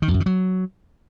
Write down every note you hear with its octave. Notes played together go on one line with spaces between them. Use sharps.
D#3
E2
F#2
D#3
F#3